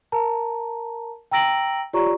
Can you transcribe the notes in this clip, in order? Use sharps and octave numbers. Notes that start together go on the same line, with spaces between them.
A#4 A5 A#5
G5 A#5 E6 A#6 D7 F#7
F4 G4 C#5 D5 A#5 C#6